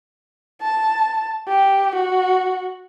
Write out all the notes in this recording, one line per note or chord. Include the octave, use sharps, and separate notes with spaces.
A5
G4
F#4